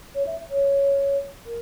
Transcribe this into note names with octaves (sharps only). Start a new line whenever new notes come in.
C#5
E5
C#5
A#4